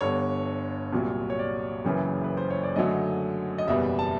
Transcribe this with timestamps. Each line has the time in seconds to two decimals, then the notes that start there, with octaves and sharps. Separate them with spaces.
0.01 G1 G2 D3 C#5
0.92 C2 A#2 F#3
1.30 C#5
1.39 D5
1.85 F#1 F#2 C#3 E3
2.24 B4
2.37 C5
2.50 C#5
2.63 D5
2.76 F#2 D3 F#3 A3 D#5
3.58 D#5
3.67 F#1 E2 B2 G3 B3 E5
3.99 A5